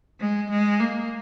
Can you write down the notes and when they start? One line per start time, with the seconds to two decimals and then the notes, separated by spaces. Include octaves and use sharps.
0.20 G#3
0.51 G#3
0.80 A#3